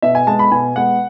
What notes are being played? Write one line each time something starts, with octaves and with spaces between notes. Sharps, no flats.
B2 E5
G#5
G#3 B3 A5
B5
B2 G#5
G#3 B3 F#5